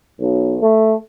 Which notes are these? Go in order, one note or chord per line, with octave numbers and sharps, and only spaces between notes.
B1
A3